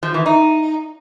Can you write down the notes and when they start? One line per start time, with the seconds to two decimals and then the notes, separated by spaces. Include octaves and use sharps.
0.03 F3
0.14 E3
0.26 D#4